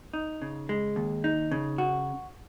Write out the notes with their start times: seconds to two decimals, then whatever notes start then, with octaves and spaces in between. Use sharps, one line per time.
0.13 D#4
0.42 C#3
0.69 G#3
0.96 D#2
1.24 D#4
1.51 C#3
1.78 F#4